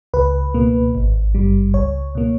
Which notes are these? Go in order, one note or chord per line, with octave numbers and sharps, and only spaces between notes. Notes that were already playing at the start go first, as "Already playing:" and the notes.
C#2 B4
B2 A#3
G#1
G2 G3
C#2 C#5
B2 A#3